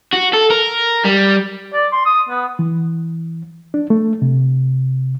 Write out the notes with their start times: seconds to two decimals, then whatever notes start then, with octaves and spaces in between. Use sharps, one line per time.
0.13 F#4
0.33 A4
0.50 A#4
1.04 G3
1.73 D5
1.92 C6
2.05 D#6
2.29 B3
2.59 E3
3.74 D4
3.90 A3
4.22 C3